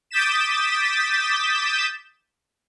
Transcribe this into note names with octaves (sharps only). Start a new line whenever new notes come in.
D6 D#6 G6 A6 B6 E7